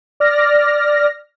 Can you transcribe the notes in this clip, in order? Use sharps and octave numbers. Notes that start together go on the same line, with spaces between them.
D5 F6 A#6